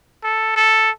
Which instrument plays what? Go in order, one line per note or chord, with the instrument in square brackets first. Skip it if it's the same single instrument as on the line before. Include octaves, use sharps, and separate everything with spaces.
[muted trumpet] A4
A4